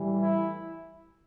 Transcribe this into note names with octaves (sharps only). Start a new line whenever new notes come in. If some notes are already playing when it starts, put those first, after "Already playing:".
Already playing: A2 E3 G3
E4